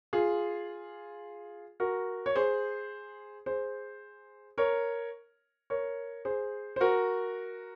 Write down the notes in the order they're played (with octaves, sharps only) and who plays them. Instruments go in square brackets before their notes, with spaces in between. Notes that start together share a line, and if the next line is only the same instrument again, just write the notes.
[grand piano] F4 G#4
F#4 A#4
C#5
G#4 C5
G#4 C5
A#4 C#5
A#4 C#5
G#4 C5
C5
F#4 A#4